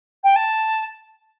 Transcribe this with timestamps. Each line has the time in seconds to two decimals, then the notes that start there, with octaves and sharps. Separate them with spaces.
0.24 G5
0.36 A5